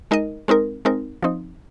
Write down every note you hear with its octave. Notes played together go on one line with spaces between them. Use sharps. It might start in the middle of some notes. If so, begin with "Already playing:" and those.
G#3 D#4 A#4 D#5
G#3 C4 D#4 A#4
G#3 C4 D#4 A#4
F3 C4 D#4